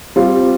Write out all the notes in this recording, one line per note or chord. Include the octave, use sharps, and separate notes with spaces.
G3 C4 F4